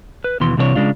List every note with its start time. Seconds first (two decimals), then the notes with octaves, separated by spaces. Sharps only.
0.24 B4
0.40 D#2 B2 E3 C6
0.57 C2 C3 E3 D4 G#4 C#5
0.75 C#3 G#3 D4 F4